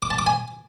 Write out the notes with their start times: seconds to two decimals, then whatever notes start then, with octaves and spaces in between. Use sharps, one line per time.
0.02 D6
0.10 A5
0.19 D6
0.27 G#5